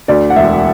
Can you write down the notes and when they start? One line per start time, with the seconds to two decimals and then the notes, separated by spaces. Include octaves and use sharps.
0.08 D2 D5
0.30 F#5
0.36 E1 E5